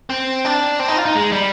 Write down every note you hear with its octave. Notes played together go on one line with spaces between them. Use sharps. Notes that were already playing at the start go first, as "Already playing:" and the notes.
C4
D4
C4
D#4
F4
D#4
G#3
G3